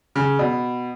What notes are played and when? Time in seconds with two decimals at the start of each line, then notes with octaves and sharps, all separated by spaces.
0.16 C#3
0.39 B2